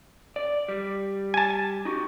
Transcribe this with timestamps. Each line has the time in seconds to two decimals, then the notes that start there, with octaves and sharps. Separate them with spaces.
0.36 D5
0.69 G3
1.34 G#5 A5
1.85 D#4 F#4 G4